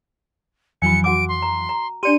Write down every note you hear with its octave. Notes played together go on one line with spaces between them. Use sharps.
F2 E3 F#3 G#5 B5 C#7
F#4 F#5 D6 D7
C6
A#5
A#5
D4 G4 D5 C6 C#7 D#7